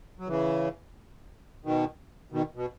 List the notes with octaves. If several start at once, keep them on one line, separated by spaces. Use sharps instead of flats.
F#3
C#3 E3
B2 D#3
B2 D#3
B2